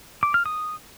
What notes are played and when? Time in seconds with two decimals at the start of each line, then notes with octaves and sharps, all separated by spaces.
0.23 D6
0.34 F6
0.46 D#6